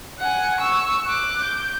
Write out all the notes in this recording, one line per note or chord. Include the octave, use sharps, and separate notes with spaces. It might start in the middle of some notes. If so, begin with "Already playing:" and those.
F#5 G#5
C#6 E6
D6 F#6
G6